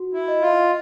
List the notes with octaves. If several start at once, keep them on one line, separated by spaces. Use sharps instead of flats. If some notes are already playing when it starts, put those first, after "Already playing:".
Already playing: F#4
E4
D#5
F4